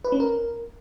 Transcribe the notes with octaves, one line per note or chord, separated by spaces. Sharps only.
B4
C#4
A#4